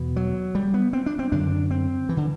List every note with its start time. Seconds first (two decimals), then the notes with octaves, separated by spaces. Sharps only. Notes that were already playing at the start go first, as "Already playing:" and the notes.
Already playing: E2 B2
0.16 F#3
0.55 G3
0.74 B3
0.93 C4
1.06 D4
1.19 C4
1.32 F#2 D3 D4
1.71 C4
2.09 E3
2.17 D3